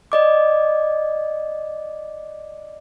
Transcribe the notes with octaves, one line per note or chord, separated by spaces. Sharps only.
D5 D#5 D6